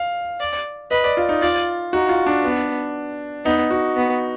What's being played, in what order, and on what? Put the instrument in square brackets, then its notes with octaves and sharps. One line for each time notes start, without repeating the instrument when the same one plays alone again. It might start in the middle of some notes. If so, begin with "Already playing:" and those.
Already playing: [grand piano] F5
[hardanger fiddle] D5
[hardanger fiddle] B4 [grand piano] D#5
[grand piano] D5
F4
D#4
[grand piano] F4 [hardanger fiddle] D5
[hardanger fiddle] D#4 [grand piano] F#4
[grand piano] F4
D4
[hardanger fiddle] B3
[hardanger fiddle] B3 [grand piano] D#4
[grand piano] F#4
[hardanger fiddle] B3